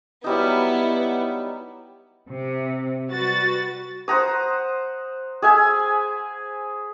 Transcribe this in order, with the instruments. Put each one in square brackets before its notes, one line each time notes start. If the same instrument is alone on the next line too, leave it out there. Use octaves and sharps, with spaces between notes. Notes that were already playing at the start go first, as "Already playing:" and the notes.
[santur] F#3 G3 D#4 [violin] B3 E4
[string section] C3
G3 F#4 B4 A6
[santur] C5 F#5 A#5 D#6
G#4 E5 G#5